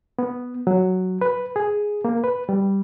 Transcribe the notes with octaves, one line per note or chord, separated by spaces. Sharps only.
B3
F#3
B4
G#4
A#3
B4
G3